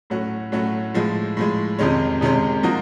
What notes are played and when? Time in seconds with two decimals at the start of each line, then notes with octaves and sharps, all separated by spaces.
0.10 A2 F#3 A3 C#4 F#4
0.52 A2 F#3 A3 C#4 F#4
0.94 A2 F3 G#3
1.37 A2 F3 G#3
1.79 F2 C3 D#3 G#3 C#4
2.21 F2 C3 D#3 G#3 C#4
2.63 F3 A#3 D#4 F#4